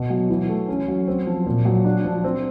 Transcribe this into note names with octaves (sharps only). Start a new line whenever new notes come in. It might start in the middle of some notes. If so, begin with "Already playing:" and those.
Already playing: B2
F#3
E3
A3
C#4
F#3
C4
F3
A#2
F#3
D4
F3
C4